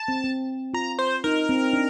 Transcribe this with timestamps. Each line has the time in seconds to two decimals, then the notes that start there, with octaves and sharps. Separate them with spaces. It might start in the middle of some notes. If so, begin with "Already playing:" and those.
Already playing: A5
0.08 C4
0.24 C4
0.74 F4 A#5
0.99 C5
1.24 D#4 A#4
1.49 C4
1.73 D4